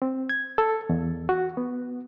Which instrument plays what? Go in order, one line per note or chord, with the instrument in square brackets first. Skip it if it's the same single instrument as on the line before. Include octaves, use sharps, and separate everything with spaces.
[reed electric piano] C4
G#6
A4
E2
F#4
B3